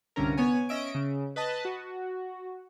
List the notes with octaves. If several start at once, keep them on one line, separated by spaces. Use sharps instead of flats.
C2 G2 D3 C#4 A#4
B3 C#5 G#5
C#4 D#5 E5 D7
C#3
B4 D#5 A5
F#4